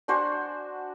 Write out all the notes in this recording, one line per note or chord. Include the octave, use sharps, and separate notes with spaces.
D4 F#4 C5 G#5